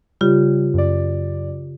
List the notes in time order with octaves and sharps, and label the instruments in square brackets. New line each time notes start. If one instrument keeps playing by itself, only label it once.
[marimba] C#3 F4 G4 [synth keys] G3
[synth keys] F#2 D5